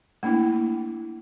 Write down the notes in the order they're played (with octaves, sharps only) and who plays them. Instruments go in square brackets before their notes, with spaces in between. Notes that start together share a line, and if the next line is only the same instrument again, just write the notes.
[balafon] A3 A#3 D4 E4